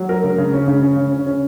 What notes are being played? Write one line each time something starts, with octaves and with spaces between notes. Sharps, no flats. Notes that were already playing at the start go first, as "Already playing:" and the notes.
Already playing: F#3
A#4
C#3
C#3
C#4
C#3
C#4
C#3
C#4
C#4